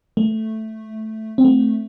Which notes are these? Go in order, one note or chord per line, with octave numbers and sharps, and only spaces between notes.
A3
C4
A3